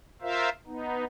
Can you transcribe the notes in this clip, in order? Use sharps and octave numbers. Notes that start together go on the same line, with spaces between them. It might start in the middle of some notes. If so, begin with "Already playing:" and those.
F4 A#4 C5 E5 F5
B3 D#4